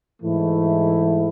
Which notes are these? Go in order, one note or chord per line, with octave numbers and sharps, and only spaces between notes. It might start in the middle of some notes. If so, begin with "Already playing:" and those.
G#2 E3 A3 E4